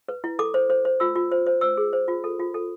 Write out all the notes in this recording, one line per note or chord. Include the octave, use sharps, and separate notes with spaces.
B4
E4
A4 D6
C5
C5
C5
F4 E6
F4
C5
C5
C5 E6
G#4
C5
F4
A4
F4
A4